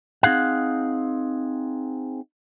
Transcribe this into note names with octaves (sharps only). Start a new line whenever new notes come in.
C4 D#4 G#4 F5 F#5